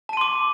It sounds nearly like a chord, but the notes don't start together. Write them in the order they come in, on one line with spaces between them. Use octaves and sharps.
A5 D#7 C6 D6